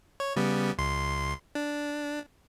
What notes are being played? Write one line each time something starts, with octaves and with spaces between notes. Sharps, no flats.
C#5
C#3 G3 B3
C#2 C6
D4